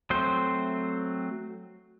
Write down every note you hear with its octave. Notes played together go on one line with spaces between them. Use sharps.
F#3 A3 C4 C5 G6